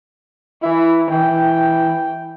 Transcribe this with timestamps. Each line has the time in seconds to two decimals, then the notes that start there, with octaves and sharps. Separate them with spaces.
0.63 E3 E4
1.11 E3 G5